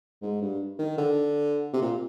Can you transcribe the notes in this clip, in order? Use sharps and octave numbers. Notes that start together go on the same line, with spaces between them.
G#2
G2
D#3
D3
C3
A#2